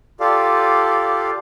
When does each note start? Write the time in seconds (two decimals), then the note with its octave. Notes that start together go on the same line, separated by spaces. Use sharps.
0.20 F4 G4 A4 D5 F5